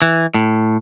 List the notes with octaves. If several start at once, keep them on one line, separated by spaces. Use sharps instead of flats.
E3
A2